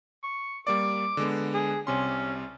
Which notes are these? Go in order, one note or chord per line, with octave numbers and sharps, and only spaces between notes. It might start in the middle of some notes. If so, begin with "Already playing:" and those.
C#6
G3 A#3 D5 D6
D3 G#3 B3
G#4
C2 C3 C#4 C6